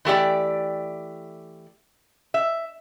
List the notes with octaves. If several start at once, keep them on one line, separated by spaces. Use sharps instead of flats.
E3 A3 G4 D5
E5